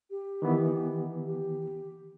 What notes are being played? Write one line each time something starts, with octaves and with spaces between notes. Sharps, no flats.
G4
D#3 E3 B3
G4